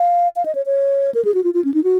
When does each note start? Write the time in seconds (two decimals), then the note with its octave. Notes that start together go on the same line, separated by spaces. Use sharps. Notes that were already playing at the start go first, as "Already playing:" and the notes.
Already playing: F5
0.36 F5
0.45 D#5
0.55 C#5
0.66 C#5
1.15 A#4
1.25 G#4
1.34 F#4
1.44 F4
1.54 F4
1.64 C#4
1.74 D#4
1.84 F#4